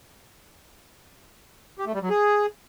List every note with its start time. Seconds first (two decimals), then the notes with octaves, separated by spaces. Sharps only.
1.78 G4
1.86 A3
1.94 G3
2.02 F#3
2.10 G#4